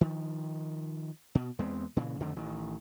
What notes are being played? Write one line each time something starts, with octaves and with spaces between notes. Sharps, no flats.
D#3 F3
B2
E2 G#3 B3 C4
A#2 C#3 E3
F2 D3 D#3 A3
A1 D#3